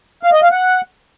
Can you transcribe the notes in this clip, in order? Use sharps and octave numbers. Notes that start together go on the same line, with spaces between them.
F5
D#5
F5
F#5